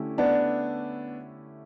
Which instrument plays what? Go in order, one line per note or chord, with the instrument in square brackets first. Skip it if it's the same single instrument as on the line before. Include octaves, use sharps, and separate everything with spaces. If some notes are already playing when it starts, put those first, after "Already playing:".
Already playing: [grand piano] D3 A3 C#4 E4 G4
[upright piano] B3 D4